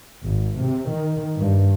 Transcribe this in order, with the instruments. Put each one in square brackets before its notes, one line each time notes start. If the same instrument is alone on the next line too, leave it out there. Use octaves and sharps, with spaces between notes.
[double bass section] G#1
C3
D#3
G2